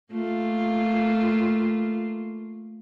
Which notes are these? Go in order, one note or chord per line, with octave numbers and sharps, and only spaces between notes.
A3 A#3 F4